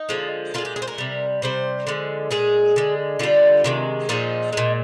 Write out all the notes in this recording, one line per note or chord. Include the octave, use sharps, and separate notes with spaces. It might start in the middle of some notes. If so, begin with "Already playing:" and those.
Already playing: D#4
D3 F3 G#3
A#2 F3 G#3 F4
G4
G#4
C5
A#4
C3 G3
C3 G3 C5
D3 F3 G#3
A#2 G#3 G#4
D3 G#3
D3 G3 F4
C3 D#3 G#3
A#2 F3 G#3 D#4
A#2 G#3